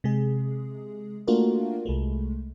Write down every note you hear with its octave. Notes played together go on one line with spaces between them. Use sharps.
C3 G#3 G#4
A3 A#3 D4 F4 F#4 A#4
C2 G#3 A3